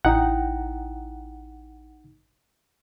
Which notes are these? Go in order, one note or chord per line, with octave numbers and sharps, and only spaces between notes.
A1 D#4 E4 F#5 G5